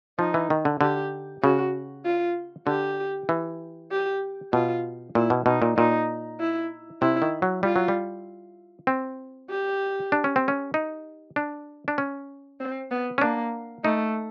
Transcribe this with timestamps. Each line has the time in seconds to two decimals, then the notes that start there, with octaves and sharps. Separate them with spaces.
0.19 F3 D#4
0.34 E3
0.50 D#3
0.65 D3
0.81 D3 G4
1.43 C#3 F#4
2.05 F4
2.67 D3 G4
3.29 E3
3.91 G4
4.53 B2 F4
5.15 A#2 E4
5.30 B2
5.46 B2 D#4
5.62 A#2
5.77 A#2 D#4
6.40 E4
7.01 C3 E4
7.22 D#3
7.42 F#3
7.63 G3 F4
7.76 F#3
7.88 G3
8.87 C4
9.50 G4
10.12 D4
10.24 C#4
10.36 C4
10.48 C#4
10.74 D#4
11.36 D4
11.88 D4
11.98 C#4
12.60 C4
12.91 B3
13.18 C#4
13.21 A#3 D4
13.84 A3 D#4